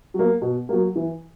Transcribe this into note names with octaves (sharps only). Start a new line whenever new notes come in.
F#3 A#3
B2
F#3 A#3
E3